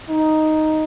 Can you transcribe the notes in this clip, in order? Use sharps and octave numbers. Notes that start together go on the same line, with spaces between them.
D#4